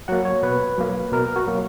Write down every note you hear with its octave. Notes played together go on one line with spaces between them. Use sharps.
F#3 A#3 F#5
C#5
B2 B4
F#3 A#3
B2 A#4
F#4
F#3 A#3